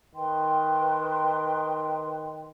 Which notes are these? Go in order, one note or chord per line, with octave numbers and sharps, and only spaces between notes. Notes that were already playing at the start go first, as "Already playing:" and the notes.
D#3 B4 G5 C6